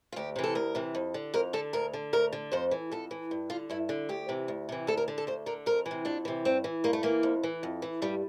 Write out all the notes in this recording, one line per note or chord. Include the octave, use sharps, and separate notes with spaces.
F4
D2 G4
C3 E3
A4
D2 A#4
C3 E3
F2
D3
F2 A#4
D3 A4
D2 A#4
D3
D2 A#4
D3
F2 C5
E3
F2 A4
E3
G2
D3 F4
G2 E4
D3
D2 G4
C3 E3
D2
C3 E3
D2 A4
A#4
D3
A4
D2 C5
D3 A#4
F2 A#4
E3
C3
F2 D4
C3 E3
G2 C4
E3
G2 A#3
A3
E3 A#3
F2
E3
F2
E3
G2 G3